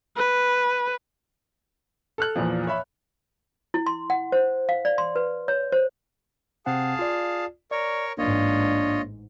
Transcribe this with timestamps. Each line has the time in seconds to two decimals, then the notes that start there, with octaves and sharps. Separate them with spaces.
0.17 B4
2.18 A4 F6 F#6
2.36 E2 A#2 E3 F3
2.67 C#5 E5 B5
3.74 E4
3.86 C6
4.10 F#5
4.32 C5
4.69 F5
4.85 D5
4.98 C6
5.16 B4
5.48 C#5
5.72 C5
6.66 C3 C4 G#4 F5 F#5 A5
6.99 F4 D5
7.71 A#4 C#5 D5 C#6
8.18 A1 G#2 A#3 D4 F4 C#5 D#5